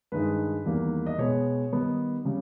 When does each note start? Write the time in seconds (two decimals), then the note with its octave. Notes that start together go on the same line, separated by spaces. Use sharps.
0.12 G2 D#3 G#3 D#4 B4
0.66 E2 D#3 G3 A#3
1.06 D#5
1.18 B2 G#3 B3 C#5
1.72 D#3 G3 B3 D#4
2.25 C#3 G3